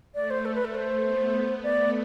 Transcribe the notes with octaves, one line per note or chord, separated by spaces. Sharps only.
A3 D5
C5
A4
B4
A4
C5
B3
A3 D5